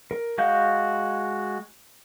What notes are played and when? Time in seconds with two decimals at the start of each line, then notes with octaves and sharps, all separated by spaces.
0.11 A#4
0.38 G#3 F#4 F5 G6